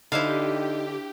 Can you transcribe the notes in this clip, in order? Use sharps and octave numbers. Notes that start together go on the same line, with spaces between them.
D3 D#4 E4 G4 C5 F5